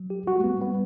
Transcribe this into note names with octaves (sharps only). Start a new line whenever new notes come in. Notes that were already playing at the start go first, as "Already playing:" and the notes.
Already playing: F#3
G4
G3 F#4
A3
B3
G3 B3